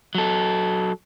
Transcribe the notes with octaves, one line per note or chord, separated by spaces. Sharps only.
F#3 A4